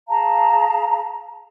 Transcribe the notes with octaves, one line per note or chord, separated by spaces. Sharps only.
G#4 F5 A5 A#5